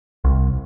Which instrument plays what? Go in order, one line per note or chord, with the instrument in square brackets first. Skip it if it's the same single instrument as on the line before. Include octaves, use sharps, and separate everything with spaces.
[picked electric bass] C2